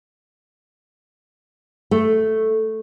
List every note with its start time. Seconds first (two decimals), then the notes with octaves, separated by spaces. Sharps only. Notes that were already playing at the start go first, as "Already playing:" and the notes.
1.91 A3